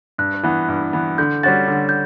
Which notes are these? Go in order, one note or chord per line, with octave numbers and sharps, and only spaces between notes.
G2 F#6
E3 B3
G2
E3 B3
D3 G6
G3 C#4 F#4 A6
D3
G6